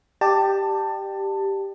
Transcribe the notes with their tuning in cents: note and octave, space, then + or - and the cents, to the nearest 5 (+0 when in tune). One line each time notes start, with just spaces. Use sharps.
G4 +0 D5 +35 A5 +15